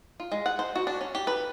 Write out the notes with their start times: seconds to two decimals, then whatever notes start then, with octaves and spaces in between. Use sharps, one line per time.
0.20 F4
0.32 G#3
0.46 F#5
0.59 C5
0.75 F#4
0.87 D4
1.01 C#4
1.15 G4
1.27 B4